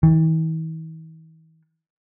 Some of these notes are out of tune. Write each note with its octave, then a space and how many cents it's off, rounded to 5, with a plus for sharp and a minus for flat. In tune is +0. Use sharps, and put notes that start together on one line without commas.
E3 -45